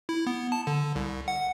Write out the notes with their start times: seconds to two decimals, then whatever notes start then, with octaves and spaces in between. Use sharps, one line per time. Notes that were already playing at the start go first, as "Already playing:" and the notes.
0.09 E4
0.27 B3
0.52 A5
0.67 D3
0.95 C2
1.28 F#5